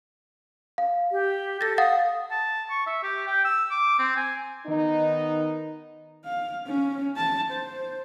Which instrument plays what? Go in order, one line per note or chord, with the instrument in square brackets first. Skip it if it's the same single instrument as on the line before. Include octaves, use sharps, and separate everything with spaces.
[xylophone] F5
[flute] G4
[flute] A4 [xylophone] A6 A#6
[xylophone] F5 F#5 A6 [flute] D#6
[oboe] A5
C#6
E5
G4
G5
E6
D6
C4
G#5
[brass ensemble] D#3 B3 D#4
[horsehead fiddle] F5
C#4
A5
C5